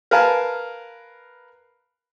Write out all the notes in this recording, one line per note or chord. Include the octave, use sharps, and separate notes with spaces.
A#4 B4 F5 G#5 A5